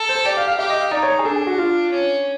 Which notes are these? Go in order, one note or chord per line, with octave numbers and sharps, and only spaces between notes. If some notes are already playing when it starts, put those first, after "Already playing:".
Already playing: A4
C5
G4 D5
F5
F5
G4 E5
D#5
F5
D#4 D5
C#5
G#4
D4 A4
G#4
F#4
F4
C#4